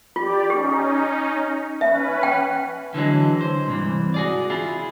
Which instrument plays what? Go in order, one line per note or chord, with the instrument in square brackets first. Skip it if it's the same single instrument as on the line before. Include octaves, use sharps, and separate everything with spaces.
[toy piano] F4 [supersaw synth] G4 D5
[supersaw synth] C#4 D#4 [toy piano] G4
[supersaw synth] C#4 B4 [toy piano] E5
[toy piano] G5
[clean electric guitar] D3 E3 F#3 G#3
C5
C2 G#2 E3
F#4 G#4 D5
E4 F4 G#4